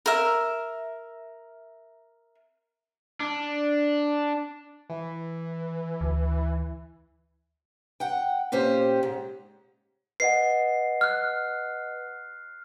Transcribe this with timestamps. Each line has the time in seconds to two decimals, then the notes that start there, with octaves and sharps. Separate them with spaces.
0.06 A#4 E5
3.20 D4
4.89 E3
6.01 D2
8.00 F#5 G5
8.52 A#2 C#4 G4 C5
9.03 G#2
10.20 B4 D#5 F#5 C7
11.01 F6 F#6